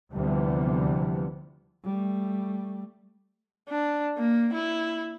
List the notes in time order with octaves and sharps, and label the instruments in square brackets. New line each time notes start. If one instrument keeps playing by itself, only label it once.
[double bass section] D2 C3 E3 F3 G3 B3
[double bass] G3 A3
[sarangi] D4
A#3
E4